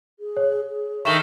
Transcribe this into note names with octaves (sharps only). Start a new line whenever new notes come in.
G#4
C#5
G#4
D#3 A3 C#6 E7 G7